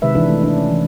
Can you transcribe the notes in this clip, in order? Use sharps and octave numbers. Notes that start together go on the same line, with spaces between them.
C3 D#3 G#3 B4 E5
E3 D4 E4 B4
A3
D4
C#4
E3